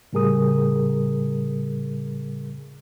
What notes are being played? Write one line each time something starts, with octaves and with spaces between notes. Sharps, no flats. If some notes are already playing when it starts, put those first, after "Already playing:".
A2 C#3 G3 G#4 A#4 D#6